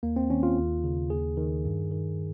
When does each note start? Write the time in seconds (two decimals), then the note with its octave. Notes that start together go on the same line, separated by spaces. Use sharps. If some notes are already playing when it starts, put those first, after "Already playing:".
0.03 D#2 A#3
0.16 C4
0.30 D#3 C#4
0.43 F4
0.58 D#2
0.84 C#3
1.10 D#2 G#4
1.37 D#3
1.65 G2
1.91 D#3